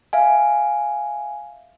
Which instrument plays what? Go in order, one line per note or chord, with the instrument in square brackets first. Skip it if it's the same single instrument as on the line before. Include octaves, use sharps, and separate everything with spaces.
[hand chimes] E5 F5 G#5